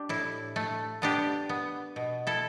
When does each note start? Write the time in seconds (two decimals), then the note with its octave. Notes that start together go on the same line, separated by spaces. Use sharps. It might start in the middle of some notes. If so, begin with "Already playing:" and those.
Already playing: D4 G4
0.09 A2 E4
0.56 A3
1.02 B3 D4 G4
1.49 B3
1.96 B2
2.27 E4 A4